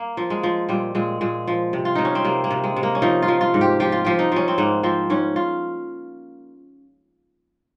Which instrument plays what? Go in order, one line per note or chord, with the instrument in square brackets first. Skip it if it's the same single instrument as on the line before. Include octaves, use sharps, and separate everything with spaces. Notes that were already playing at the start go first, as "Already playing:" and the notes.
Already playing: [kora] A#3
F3
G#3
F3
A#2 G3
A#2 G#3
A#2 G#3
F3
C3
F4
C3 D#4
C#4
C4
C3 A#3
A#3
C3
G#3
C3
A#3
C#4
F3 D#4
F4
F3
F4
G#2
G4
F3 G4
F4
F3 G4
D#4
F3 C#4
C4
G#2 A#3
F3 C4
G#2 C#4
F4